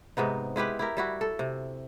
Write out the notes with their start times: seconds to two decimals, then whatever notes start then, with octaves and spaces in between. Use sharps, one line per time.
0.17 G#2 C3 B3 D#4
0.56 G#3 E4 G4 B4
0.79 E4 G4 A#4
0.97 G3 E4 F#4
1.21 A4
1.39 C3